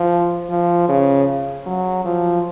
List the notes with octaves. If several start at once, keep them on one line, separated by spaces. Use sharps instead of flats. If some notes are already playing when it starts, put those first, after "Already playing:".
Already playing: F3
F3
C#3
F#3
F3